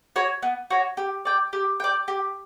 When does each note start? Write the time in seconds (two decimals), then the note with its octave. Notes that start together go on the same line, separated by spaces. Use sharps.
0.16 F#4 C#5
0.43 B3
0.70 F#4 C#5
0.97 G4
1.25 D5 G5
1.53 G4
1.80 D5 G5
2.08 G4